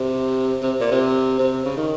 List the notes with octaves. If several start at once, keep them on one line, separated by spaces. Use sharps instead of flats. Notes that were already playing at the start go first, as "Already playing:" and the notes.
Already playing: C3
C3
A#2
C3
C3
C#3
D#3